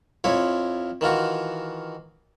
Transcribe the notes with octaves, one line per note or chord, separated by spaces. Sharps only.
F2 F3 E4 C#5
D#3 E3 F4 F#4